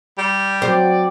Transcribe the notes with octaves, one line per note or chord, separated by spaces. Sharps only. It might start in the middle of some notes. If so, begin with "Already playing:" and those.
G3
F#3 C4 D5